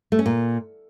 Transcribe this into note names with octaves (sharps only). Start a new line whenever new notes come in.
A3
C#4
A#2